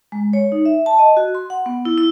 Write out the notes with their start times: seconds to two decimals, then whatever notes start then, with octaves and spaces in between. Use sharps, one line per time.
0.12 G#3
0.33 C#5
0.52 D#4
0.66 E5
0.86 A5
0.99 D#5
1.17 F#4
1.35 C6
1.50 F#5
1.66 B3
1.85 E4
1.98 E4